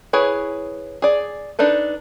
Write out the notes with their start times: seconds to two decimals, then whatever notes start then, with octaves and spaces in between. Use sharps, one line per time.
0.13 E4 G#4 B4 C#5
1.02 G#4 D5
1.59 D4 D#4 A4 B4